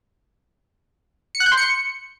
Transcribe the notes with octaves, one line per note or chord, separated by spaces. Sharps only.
C#7
F#6
G6
C6
C#7